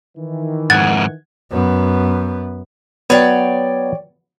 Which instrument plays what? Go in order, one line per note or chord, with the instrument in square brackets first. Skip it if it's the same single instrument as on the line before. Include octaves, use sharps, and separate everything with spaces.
[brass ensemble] D#3 E3
[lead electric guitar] F2 G#2 [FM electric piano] F#5 G#6 [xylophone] A6
[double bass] F#2 B3
[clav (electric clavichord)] F#3 B3 [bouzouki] C#5 D5 G5